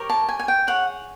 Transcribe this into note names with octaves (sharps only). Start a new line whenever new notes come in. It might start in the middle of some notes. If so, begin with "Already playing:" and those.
Already playing: G4 A#4 C#5
A5
G#5
G#5
G5
G#4 C#5 F#5